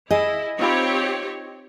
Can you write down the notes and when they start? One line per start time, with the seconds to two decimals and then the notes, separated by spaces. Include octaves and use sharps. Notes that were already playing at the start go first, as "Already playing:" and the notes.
0.11 E4 G#4 D#5
0.59 C4 D#4 F4 G4 C#5 B5